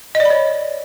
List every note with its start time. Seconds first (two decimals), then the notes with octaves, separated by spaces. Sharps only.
0.15 D#5
0.20 D5
0.25 B5
0.30 C#5